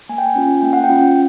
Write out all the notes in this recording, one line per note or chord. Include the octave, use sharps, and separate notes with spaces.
A#3 G#5
G5
G#5
C#4 F4
A#3 G5
F#5
G5
C#4 F4